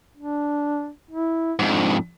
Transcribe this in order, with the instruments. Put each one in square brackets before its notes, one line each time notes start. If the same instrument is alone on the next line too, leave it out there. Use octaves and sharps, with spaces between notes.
[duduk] D4
E4
[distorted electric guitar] F2 G#2 [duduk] D4